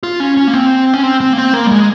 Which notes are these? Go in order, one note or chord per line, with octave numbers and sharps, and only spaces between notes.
F4
C#4
C#4
A#3
C4
C#4
C4
C4
A#3
C4
A#3
G3
G#3